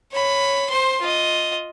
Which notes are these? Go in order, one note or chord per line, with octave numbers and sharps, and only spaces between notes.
C#5 B5
C5 C6
F4 D#5